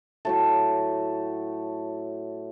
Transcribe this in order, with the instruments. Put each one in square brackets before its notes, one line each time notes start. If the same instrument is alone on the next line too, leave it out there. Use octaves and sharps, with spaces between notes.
[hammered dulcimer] A2 F#3 A3 A4